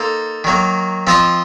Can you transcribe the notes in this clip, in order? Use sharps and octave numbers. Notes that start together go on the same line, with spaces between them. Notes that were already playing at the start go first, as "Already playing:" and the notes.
Already playing: A#3 D#4 A4 C5
D#3 F#3 A#3
F3 C4 F4 C5 D#5